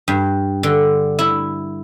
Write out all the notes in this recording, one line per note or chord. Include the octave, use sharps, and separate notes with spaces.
G2
D3
E4